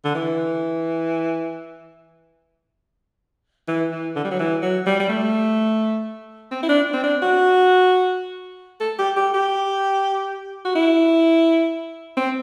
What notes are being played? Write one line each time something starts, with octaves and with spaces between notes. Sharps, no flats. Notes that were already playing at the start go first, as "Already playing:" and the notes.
D3
E3
E3
E3
D3
G3
F#3
E3
F#3
G3
G3
A3
C4
E4
D4
C4
D4
F#4
A4
G4
G4
G4
F#4
E4
C4